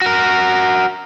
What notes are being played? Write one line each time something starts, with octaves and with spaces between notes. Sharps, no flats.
F#4 A#4